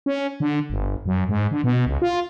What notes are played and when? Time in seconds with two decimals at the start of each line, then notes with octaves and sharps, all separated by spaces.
0.06 C#4
0.40 D3
0.70 G1
1.06 F#2
1.29 G#2
1.51 D3
1.64 B2
1.87 C#2
2.02 F4